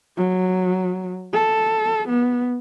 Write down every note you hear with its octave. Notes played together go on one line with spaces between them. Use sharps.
F#3
A4
B3